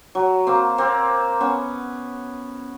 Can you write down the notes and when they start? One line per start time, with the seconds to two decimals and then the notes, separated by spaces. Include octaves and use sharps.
0.15 F#3
0.47 A#3 C4
0.78 A#3 C4
1.40 B3 C#4